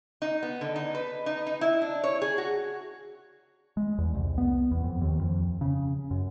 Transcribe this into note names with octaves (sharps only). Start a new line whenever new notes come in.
D#4
B3
D3
D#4
B4
D#4
D#4
E4
D4
C#5
G#4
F#4
G#3
E2
C2
B3
E2
F2
D#2
F2
C#3
F#2